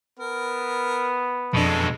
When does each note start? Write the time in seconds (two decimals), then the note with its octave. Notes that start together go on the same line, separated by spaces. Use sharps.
0.19 B3 A#4
1.54 F2 B2 G#3 D4 A4